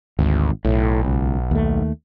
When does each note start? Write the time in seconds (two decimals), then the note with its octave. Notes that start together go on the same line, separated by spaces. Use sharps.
0.19 G#1 D2
0.65 B1 A2
1.05 C#2
1.51 D#2 A3